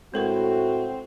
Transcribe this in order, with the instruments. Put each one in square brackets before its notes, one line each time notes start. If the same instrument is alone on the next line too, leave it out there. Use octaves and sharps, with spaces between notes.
[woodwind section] A2 [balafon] G#3 A4 A#4 [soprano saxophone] C4 [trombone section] F#4